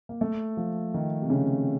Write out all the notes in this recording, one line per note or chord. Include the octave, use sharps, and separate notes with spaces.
A#3
A3
F3
D#3
C3
C#3